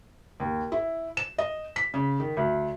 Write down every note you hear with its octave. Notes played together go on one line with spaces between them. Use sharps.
D#2
E4
E7
D#5
B6
C#3
D#3
D2